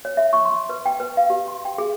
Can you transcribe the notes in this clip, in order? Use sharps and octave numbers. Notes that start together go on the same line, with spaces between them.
C#5
E5
C#6
C6
B4
G5
B4
F5
G4
C6
G5
G#4